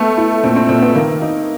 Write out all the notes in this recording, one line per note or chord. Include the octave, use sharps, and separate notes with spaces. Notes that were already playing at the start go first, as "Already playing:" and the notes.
Already playing: A3 B3
E4
A#2 C4
C4
A#2 C4
B3
D#3 A#3
D#4